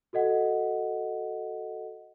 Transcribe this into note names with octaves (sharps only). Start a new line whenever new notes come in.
F#4 A4 D#5 F#5